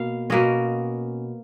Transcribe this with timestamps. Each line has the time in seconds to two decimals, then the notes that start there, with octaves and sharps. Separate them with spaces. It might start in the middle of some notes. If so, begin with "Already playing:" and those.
Already playing: B2 A#3 F5
0.30 B2 A#3 C#4 D#5